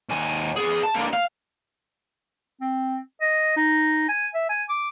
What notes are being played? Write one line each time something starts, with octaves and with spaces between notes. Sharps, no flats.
D#2 G#5
B3 G#4
A5
D3 A#3
F5
C4
D#5
D#4
G#5
E5
G#5
D6